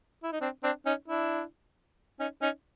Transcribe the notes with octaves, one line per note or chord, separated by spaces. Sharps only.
E4
D#4
C4 D4
C4 D4
C#4 D#4
D4 E4
C#4 D#4
C#4 D#4